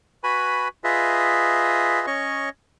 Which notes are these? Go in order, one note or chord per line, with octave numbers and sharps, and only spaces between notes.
F#4 B4 G#5 B5
F4 G#4 B4 D#5 E5
C#4 C#5 D#5 C#6